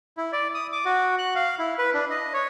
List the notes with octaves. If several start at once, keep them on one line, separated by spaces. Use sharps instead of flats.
E4
D5
D#6
D6
F#4
F#6
F5
E4
B4
D4
D#5
C#5